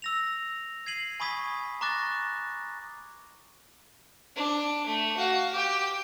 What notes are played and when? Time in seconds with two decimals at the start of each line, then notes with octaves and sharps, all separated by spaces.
0.02 E6 A#6 F7
0.86 G#6 C7 D#7 F#7
1.20 G#5 B5 C#6 D#6 G#6 B6
1.81 A#5 C#6 D6 F#6 A6 A#6
4.36 D4
4.86 A3
5.17 F#4 F5
5.52 G4 G5